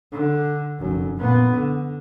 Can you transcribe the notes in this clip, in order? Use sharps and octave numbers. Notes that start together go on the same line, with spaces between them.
D3
F1 F#2
A#2 B3
D3